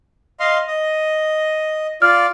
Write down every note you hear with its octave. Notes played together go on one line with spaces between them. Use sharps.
D#5 F5 C6
D#5
F4 D5 F6